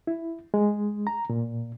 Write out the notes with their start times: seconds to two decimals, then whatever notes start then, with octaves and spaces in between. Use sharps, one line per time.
0.07 E4
0.54 G#3
1.07 A#5
1.30 A#2